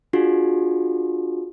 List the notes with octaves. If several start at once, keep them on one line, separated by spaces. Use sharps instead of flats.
D4 F4 F#4 G#4